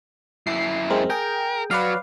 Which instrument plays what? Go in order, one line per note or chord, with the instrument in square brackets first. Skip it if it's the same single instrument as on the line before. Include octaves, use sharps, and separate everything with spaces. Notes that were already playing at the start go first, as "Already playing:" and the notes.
[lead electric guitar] F#2 E4 [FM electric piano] C7
[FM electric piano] G#3 C4 A#4
[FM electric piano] G#4 G5 [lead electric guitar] A#4
[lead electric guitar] F#3 [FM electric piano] B4 D5 F5